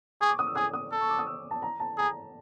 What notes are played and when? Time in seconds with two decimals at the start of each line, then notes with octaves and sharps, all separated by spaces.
0.21 G#4 C#6
0.29 D6
0.39 D#6
0.47 E6
0.56 G#4 D#6
0.74 D#6
0.92 A4
1.00 C#6
1.10 D6
1.19 D#6
1.27 E6
1.51 A5
1.62 A#5
1.80 A5
1.98 G#4 A#5